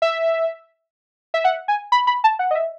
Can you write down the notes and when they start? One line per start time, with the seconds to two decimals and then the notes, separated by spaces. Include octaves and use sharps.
0.02 E5
1.34 E5
1.44 F#5
1.68 G#5
1.92 B5
2.07 B5
2.24 A5
2.39 F#5
2.51 D#5
2.55 E5